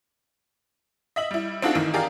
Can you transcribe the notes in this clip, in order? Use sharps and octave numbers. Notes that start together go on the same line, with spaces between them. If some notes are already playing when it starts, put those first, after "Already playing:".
D#5 E5 F#7
G3 E4
C4 D4 D#4 F4 F#4 A4
A1 D#3 E3
G4 G#4 A#4 D5 F5